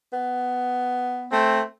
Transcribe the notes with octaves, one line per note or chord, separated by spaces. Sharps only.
B3
A3 C4